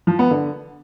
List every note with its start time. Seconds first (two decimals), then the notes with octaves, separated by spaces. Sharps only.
0.07 F3
0.19 B3
0.31 D3